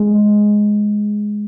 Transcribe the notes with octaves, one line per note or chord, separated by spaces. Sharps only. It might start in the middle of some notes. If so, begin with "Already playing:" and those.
Already playing: G#3